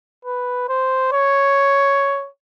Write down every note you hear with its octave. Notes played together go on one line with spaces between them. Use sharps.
B4
C5
C#5